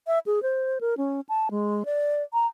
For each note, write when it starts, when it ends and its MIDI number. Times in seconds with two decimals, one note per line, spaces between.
0.07 0.19 76
0.26 0.42 68
0.43 0.79 72
0.81 0.94 70
0.97 1.21 61
1.29 1.49 81
1.51 1.83 56
1.85 2.23 74
2.33 2.47 82